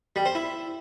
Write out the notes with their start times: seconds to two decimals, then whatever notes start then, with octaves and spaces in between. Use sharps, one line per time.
0.16 G3
0.25 C5
0.35 E4